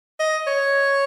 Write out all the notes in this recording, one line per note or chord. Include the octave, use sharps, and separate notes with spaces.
D#5
C#5